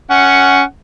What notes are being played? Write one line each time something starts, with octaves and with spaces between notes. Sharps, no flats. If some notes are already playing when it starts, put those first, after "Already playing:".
C#4 F#5